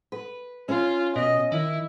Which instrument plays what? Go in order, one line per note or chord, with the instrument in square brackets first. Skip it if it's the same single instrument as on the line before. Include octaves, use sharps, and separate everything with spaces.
[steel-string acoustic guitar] B4
[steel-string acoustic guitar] C#4 [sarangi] F4
[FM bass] B2 [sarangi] D#5
[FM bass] D#3 [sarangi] E4